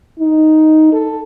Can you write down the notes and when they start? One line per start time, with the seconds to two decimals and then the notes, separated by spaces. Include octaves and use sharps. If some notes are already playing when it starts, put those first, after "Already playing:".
0.20 D#4
0.92 A4